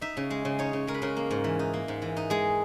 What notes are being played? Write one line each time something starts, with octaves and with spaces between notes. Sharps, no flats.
D#4 E5
C#3
G#3
C#3
D#4 C#5
C#3
G#3 A#4
B4
C#3 A#4
A#3
G#2
E3
D#4
A#3
G#2
E3
D#4
G#3 G#4